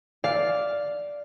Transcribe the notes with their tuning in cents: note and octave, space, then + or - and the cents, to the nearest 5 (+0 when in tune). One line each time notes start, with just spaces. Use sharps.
D5 -5 F5 +0 E6 +0